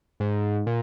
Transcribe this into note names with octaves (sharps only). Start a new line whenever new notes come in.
G#2
A#2